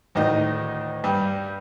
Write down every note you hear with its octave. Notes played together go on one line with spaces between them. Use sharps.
D2 A2 D#3 D4 D#5
G2 G3